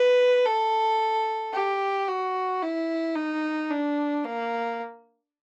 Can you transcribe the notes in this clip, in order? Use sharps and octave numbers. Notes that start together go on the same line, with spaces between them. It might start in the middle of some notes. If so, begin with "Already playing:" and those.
Already playing: B4
A4
G4
F#4
E4
D#4
D4
A#3